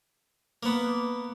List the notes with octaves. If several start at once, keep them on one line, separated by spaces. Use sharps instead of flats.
A#3 B3